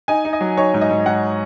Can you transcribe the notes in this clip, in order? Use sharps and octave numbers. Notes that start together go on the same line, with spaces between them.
D#4 G#5
D#4
D#5
F#3
D#4 C#5
G#2
D#5
G#2
G#2 F#5